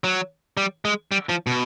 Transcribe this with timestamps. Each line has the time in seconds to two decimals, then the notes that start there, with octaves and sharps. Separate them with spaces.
0.04 F#3
0.57 G3
0.85 G#3
1.12 G3
1.29 F3
1.47 B2